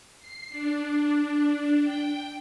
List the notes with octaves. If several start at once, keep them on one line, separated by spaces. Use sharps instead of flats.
C7
D4
G5